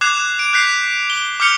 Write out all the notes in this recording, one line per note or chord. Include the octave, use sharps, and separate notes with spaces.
D6 F#6 G#6 C7 E7 F7
D7
F#6 G6 B6 C7 F7
G7
D6 F6 G6 C#7 F7 G7